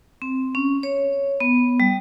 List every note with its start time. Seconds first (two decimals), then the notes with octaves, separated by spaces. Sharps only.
0.22 C4
0.55 C#4
0.83 C#5
1.40 B3
1.80 G3